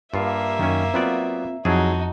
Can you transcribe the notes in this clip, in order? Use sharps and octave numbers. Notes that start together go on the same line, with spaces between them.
G2 A#3 F4 E5 F5
F#2 D#3 C#4
F#3 B3 C4 F4 D5
F2 F#3 D#4 E4 F#4 G#4 A5